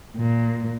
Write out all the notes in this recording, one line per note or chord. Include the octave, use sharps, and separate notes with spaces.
A#2